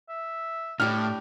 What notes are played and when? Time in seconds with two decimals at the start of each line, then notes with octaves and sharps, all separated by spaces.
0.09 E5
0.80 A2 D4 G4 F6